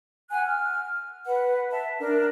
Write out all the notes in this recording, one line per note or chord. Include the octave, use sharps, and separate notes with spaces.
F#5 G#5 F#6
F6
B4 F#5
E5 A5
D4 A#4